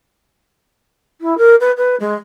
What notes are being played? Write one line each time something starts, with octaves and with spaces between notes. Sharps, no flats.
E4
A#4
B4
B4
G#3